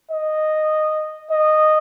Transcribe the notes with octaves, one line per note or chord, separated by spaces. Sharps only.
D#5
D#5